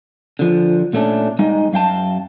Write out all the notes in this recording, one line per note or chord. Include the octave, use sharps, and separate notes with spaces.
D3 F3
A#2 A3 C#4 D4
G3 G#3 D#4 D#5
F#2 F5 G5 A5